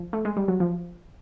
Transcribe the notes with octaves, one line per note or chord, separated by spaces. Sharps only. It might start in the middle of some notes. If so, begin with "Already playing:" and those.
Already playing: F3
A3
G#3
G3
F#3
F3